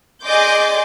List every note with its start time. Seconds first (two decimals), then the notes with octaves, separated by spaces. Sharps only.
0.24 G#4 D5 D#5 C6 D6 G6